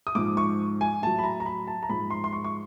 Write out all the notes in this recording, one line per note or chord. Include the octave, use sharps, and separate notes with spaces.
D#6
G#2 F3 G#3 D6
C#6
G#5
A2 F#3 A5
B5
A#5
A#5
B5
A5
A#5
G#2 F3 G#3 B5
C6
C6
C#6
C#6